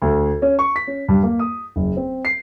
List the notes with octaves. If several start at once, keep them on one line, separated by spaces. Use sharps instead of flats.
D2
C#4
C#6
B6
C#4
G2
A#3
D#6
F#1
C4
C7